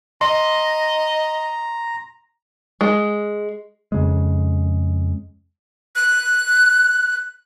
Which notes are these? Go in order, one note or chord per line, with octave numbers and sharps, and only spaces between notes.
D#5 A#5 C6
G#3
F2 C#3 G#3
F#6